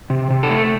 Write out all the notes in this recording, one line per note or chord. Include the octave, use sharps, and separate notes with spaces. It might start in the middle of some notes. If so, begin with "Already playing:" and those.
C3
C3
A4
A3